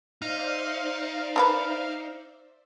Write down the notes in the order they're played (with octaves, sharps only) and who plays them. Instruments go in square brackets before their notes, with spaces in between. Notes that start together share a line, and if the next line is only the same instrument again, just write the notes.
[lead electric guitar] D#4 [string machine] C5 D5 E5 [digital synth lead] F5
[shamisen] D4 A#4 B4